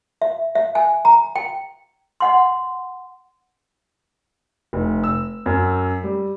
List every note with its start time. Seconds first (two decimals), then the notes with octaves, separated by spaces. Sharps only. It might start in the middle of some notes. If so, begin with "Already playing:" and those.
0.22 E5
0.55 E5
0.75 G#5
1.05 A#5
1.36 G5
2.20 D#5 F#5 C6
4.73 F1
5.04 E6
5.46 F#2
6.03 G3